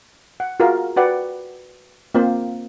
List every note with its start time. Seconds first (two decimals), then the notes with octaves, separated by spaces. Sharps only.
0.40 F#5
0.60 F4 F#4 G#4 A#4 E5 F5
0.96 F#4 B4 D5 F#5 G5
2.15 A#3 C4 F4 C5